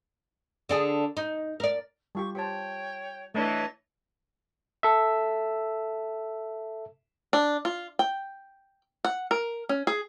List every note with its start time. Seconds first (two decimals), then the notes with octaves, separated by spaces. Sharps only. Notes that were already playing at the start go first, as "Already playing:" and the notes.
0.69 D3 D4 G#4
1.17 D#4
1.60 A#4 D5
2.15 G3 F4 G4 C#6
2.35 G4 C5 C#5 G5 A5
3.35 E3 A3 D4 C#5 D#5 A5
4.83 A4 E5
7.33 D4
7.65 F4
7.99 G5
9.04 F#5
9.31 A#4
9.69 C#4
9.87 G#4